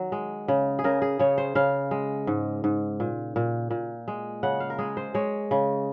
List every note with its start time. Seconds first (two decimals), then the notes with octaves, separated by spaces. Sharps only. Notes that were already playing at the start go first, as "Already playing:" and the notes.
Already playing: D#3 F#3
0.12 G#3
0.48 C#3
0.79 G#4
0.84 C#3 A#4
1.02 G#4
1.19 C#3 C#5
1.38 C5
1.55 C#3 F5
1.91 G#3
2.27 G#2
2.64 G#2
3.00 A#2
3.36 A#2
3.71 A#2
4.08 G#3
4.43 C#3 F#5
4.60 F5
4.70 A#4
4.78 G#3 G#4
4.97 C5
5.14 G#3 C#5
5.51 C#3